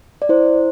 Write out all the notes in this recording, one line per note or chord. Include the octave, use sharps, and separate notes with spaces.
D5
E4 C5